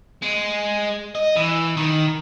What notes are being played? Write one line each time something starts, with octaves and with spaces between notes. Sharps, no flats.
G#3
D#5
E3
D#3